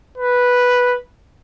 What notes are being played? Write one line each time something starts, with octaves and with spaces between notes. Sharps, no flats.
B4